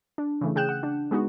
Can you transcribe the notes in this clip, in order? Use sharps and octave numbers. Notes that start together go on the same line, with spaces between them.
D4
C#3 E3 A3
C#3 G#4 G5 F#6 G6 E7
F#5
D4
G#3 B3 D#4 F#4